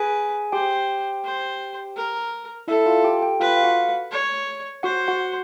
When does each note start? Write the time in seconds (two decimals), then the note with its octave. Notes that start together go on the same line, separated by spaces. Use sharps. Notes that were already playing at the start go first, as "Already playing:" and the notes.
Already playing: G#4 B4 G#5
0.52 G4 C5 G5
1.25 C5
1.96 A#4
2.68 E4 A4 E5
2.86 F4 F5
3.04 G4 G5
3.22 G4 G5
3.40 F4 B4 F5
3.57 F5
3.63 F#4 F#5
4.12 C#5
4.83 F#4 C5 F#5
5.08 F#4 F#5